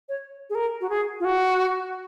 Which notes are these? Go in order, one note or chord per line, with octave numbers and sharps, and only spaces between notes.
C#5
G#4
A#4
F#4
G#4
F4
F#4